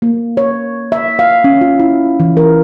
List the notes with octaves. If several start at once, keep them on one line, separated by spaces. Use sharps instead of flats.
A#3
C#5
E5
F5
C#4
F4
E4
E3
A#4